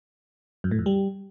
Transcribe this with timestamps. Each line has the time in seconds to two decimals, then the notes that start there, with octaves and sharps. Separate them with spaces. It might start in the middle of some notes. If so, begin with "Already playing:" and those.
0.64 F#2
0.71 A2
0.79 F2
0.86 G3